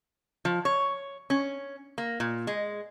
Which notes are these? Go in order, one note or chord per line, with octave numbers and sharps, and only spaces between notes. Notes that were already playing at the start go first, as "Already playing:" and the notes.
F3
C#5
C#4
A#3
A#2
G#3